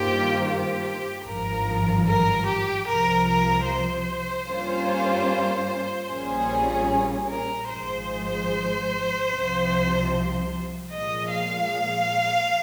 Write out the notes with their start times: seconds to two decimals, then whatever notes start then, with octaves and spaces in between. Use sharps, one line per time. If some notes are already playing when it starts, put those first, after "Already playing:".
Already playing: G2 D#3 A#3 F4 G4 C5
0.46 G4
1.26 G#1 G2 F3 A#4
2.06 A#4
2.46 G4
2.87 C2 C3 F3 A#4
3.28 A#4
3.67 C5
4.47 G2 G3 A#3 C#4 F4
6.08 A#1 A#2 G3 C#4 G#4
7.29 A#4
7.70 G#1 G#2 F3 G#3 C5
9.31 C2 C3 F3
10.91 A#2 F3 G#3 D#5
11.31 F5